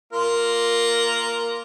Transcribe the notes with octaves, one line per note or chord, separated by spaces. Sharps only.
A#3 F4 A#4